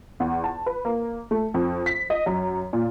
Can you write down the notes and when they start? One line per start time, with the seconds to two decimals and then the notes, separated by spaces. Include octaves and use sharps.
0.20 E2
0.44 A5
0.66 B4
0.85 A#3
1.31 A3
1.54 F2
1.86 B6
2.10 D#5
2.26 F#2
2.73 A#2